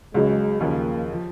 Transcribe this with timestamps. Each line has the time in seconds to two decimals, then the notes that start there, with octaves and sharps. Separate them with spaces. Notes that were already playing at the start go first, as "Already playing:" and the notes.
0.14 C#2 C#3 F#3 G#3
0.61 D#2 C#3 F3 A#3
1.12 F3